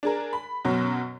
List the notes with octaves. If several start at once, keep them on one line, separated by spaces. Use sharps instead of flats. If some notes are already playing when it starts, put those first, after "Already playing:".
D4 G#4 A#4
B5
F#2 B2 F#3